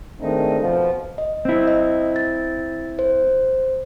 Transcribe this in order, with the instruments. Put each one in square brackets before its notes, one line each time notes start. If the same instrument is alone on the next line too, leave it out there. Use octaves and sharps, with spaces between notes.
[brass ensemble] D#3 G#3 A3 C4 D4 D#4
F2 B2 F3
[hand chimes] D#5
[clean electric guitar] C4 E4
[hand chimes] D#5
A6
C5